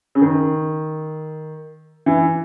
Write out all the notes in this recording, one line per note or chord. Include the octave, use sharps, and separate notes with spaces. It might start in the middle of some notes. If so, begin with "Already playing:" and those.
C#3
D#3
E3